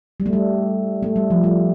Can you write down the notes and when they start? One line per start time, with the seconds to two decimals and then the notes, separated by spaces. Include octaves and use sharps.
0.20 G3
0.26 A3
0.33 G3
1.03 A3
1.16 G3
1.30 F3
1.44 G3